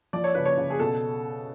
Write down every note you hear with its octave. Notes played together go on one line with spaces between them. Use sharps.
F3 D5
C#5
C#3 B4
C#5
C#3
G#4
B2 A4